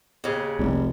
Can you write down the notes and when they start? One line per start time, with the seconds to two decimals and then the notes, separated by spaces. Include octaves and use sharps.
0.24 D#2 C#3
0.59 F1 C2